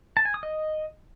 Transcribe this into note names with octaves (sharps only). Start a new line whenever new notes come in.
A5
G#5
D#6
D#5